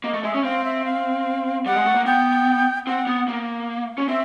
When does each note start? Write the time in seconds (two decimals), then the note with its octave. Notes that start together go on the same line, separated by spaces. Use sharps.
0.04 A#3 D#5
0.14 A3
0.23 G#3 E5
0.35 C#4
0.44 C4 F5
0.65 E5
0.85 F5
1.65 G3 F#5
1.76 G#3
1.86 A3
1.95 A#3
2.06 B3 G5
2.87 C4 F#5
3.07 B3
3.28 A#3
3.98 C#4
4.08 C4 E5